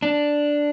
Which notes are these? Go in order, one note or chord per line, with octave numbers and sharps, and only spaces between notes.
D4